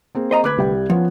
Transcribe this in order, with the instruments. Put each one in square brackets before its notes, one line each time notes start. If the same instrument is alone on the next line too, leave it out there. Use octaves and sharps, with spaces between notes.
[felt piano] A#3 C4 G#4
[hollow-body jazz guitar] C5 D#5 A#5
[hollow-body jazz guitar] D2 B4 [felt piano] D6 F#6 G#6
[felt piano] C2 G3 G5
[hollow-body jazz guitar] F3 [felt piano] B3 C#4 F4